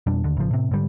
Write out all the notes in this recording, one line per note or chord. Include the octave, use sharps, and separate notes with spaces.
F2 B2 G3 D4
D#2 D3
A1 C#3 F3
A2 C3
G#2 D3 G3